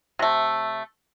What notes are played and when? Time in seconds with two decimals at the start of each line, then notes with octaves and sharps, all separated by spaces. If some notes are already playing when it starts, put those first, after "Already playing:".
0.19 C3 A3